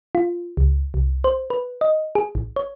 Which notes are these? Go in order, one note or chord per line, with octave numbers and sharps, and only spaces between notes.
F4
C#2
C2
C5
B4
D#5
G#4
A1
C#5